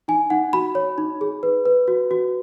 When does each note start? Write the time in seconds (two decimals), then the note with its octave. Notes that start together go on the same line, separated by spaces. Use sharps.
0.08 D#4 G#5
0.30 D#4 F#5
0.53 F#4 B5
0.75 C#5
0.98 D#4
1.21 G#4
1.43 B4
1.66 B4
1.88 F#4
2.11 F#4